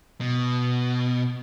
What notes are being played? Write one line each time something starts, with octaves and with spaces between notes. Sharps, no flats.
B2